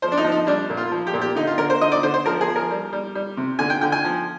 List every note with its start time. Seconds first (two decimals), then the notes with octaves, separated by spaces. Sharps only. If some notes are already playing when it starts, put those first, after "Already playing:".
0.02 F3 C5
0.12 D4
0.17 D#4
0.24 F3
0.32 D#4
0.47 G3 D4
0.70 A#2
0.77 F4
0.91 F3
1.07 G4
1.14 A#2
1.21 G4
1.36 D3 D#4
1.47 F4
1.58 D3 A#4
1.70 C5
1.81 D3 D#5
1.92 D5
2.03 D3 C5
2.14 C5
2.26 F3 A#4
2.41 G#4
2.48 F3
2.56 A#4
2.70 G3
2.93 G3
3.15 G3
3.37 C3
3.59 D3 G#5
3.70 G5
3.81 D3 G5
3.92 G#5
4.04 F3